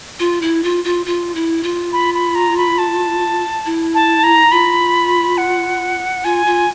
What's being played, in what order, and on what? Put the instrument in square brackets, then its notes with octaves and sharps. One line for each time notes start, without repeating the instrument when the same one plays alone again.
[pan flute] F4
E4
F4
F4
F4
E4
F4
[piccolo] B5
B5
A#5
B5
A5
[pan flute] E4
[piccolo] A5
A#5
[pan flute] F4 [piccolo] B5
[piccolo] F#5
[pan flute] F4 [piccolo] G#5
[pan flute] F4